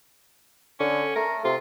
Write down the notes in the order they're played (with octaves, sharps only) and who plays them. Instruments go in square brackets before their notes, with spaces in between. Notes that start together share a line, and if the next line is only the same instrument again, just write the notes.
[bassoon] D3 [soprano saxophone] C#4
[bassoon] A3 [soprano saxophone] A#4
[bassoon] C3 [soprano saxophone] F4